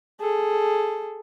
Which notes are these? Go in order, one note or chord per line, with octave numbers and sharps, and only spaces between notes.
G#4 A4